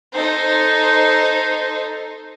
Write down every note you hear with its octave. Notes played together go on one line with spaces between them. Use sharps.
D#4 A4 C5